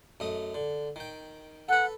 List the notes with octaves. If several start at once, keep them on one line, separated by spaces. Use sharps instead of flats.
F#2 A3 D#5
D3
D#3 G5
A4 B4 F#5